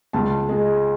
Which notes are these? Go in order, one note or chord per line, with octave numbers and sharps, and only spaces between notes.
C#2 A5
G#3